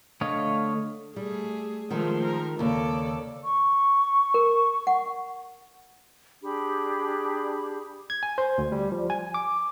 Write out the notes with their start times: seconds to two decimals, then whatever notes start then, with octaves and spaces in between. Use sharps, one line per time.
0.21 D3 A3 C#5 D#5 F5
1.16 G3 A3 G#4
1.90 D#3 F3 G#3 A3 D#4
2.25 A#4
2.59 D#2 C#3 A4 D5
3.43 C#6
4.34 A#4
4.87 F#5
6.42 D4 G4 G#4 B5
8.10 G#6
8.23 G#5
8.38 C5
8.58 D2
8.72 G3
8.92 F3
9.10 G#5
9.34 D6